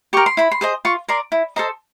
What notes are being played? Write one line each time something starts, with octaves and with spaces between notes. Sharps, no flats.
G4 A#4 C#6
C6
E4 B5
C6
G#4 C5 D#5
F4 C#6
A#4 D5 C6
E4
A4 C5 D#5 A#5